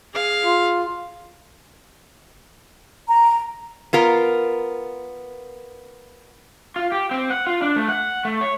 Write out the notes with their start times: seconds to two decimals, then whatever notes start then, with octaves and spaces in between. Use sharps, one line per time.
0.13 G#4 F5
0.45 F4
3.08 A#5
3.93 B3 F4 A#4
6.76 F4
6.92 G4
7.11 C4
7.30 F#5
7.47 F4
7.62 D4
7.76 A3
7.89 F#5
8.25 A3
8.41 C#5